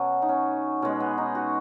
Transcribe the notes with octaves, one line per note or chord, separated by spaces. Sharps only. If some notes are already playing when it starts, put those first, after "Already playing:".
Already playing: B2 F#3 C#4 F#4
D#4
C#4
B2 G#3 C#4
B3
D#4
F#4